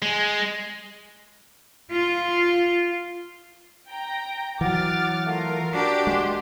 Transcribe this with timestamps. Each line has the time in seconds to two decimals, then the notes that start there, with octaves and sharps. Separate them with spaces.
0.02 G#3
1.91 F4
3.88 G5 A#5
4.61 E3 F#3 F#5 D6 F6 A6
5.26 A3 F4 A#4 A#5
5.72 D4 F#4 G4
6.07 G#3 G#4 C6